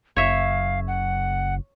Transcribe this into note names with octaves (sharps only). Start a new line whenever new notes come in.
F#1 C#5 E5 F5
F#5